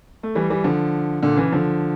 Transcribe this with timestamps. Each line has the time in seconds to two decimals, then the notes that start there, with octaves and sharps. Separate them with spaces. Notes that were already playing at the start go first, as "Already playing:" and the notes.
0.23 A3
0.35 E3 G3
0.50 E3 G3
0.64 D3 F3
1.23 A#2 D3
1.37 C#3 E3
1.52 D3 F3